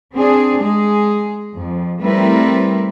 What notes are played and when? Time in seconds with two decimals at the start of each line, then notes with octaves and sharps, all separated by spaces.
0.14 C4 D4 G#4
0.61 G#3 G#4
1.57 F2
2.03 G3 A3 C4 E4 A#4 B4